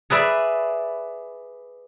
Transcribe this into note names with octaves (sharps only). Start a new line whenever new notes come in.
G#4 B4 D5 E5